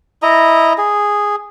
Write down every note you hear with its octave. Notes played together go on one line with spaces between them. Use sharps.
E4 D#5 A#5
G#4